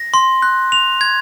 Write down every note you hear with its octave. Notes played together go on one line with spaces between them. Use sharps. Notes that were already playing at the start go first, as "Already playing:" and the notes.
Already playing: A#6
C6
F#6
F7
G#6